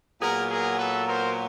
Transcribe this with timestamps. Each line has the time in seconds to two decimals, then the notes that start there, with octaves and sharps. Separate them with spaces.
0.21 A#2 F#3 B3 G#4 A#4
0.50 G#4 A#4
0.78 A4 B4
1.07 A#4 C5